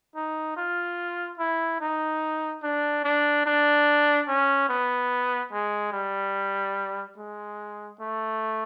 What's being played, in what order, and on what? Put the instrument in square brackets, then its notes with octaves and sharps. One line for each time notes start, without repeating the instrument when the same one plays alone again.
[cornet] D#4
F4
E4
D#4
D4
D4
D4
C#4
B3
G#3
G3
G#3
A3